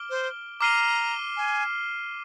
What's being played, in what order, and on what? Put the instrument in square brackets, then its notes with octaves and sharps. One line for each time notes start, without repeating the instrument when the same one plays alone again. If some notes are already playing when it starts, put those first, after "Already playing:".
Already playing: [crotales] D6 F6 D7 G7
[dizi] C5
[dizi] A#5 [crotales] D6 F6 C7 D#7 G7
[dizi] G#5